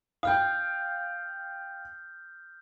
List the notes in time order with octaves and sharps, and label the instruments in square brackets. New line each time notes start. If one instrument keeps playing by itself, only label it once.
[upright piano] F5 G5 [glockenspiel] D#6 F6 G6